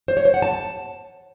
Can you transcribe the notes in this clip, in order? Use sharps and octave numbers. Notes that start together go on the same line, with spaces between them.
C5
C#5
C5
F#5
A5